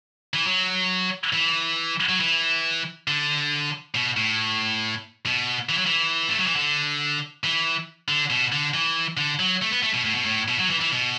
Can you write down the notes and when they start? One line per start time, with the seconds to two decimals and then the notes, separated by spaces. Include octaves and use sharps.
0.34 E3
0.47 F#3
1.33 E3
2.09 F#3
2.20 E3
3.08 D3
3.95 B2
4.17 A2
5.26 B2
5.69 E3
5.78 F#3
5.86 E3
6.28 A3
6.37 F#3
6.46 E3
6.56 D3
7.44 E3
8.08 D3
8.30 B2
8.52 D3
8.74 E3
9.17 D3
9.39 F#3
9.62 A3
9.72 B3
9.83 A3
9.94 B2
10.05 A2
10.15 B2
10.25 A2
10.48 B2
10.59 F#3
10.70 E3
10.81 E3
10.92 B2